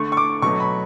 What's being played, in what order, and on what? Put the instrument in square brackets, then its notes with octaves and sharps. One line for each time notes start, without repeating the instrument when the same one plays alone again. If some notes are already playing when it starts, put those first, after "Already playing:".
Already playing: [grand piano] D3 A3 C#6
C#6
D6
B2 F#3 A3 C#6
B5